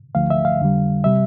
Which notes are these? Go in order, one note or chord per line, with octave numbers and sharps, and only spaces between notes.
D2 D3 F3 A3 F5
E5
F5
F2 D3 G3
C3 G3 E5